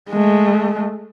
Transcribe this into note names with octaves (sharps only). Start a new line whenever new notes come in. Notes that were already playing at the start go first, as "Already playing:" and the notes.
G#3 A3